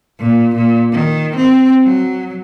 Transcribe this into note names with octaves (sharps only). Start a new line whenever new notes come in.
A#2
A#2
D#3
C4
F#3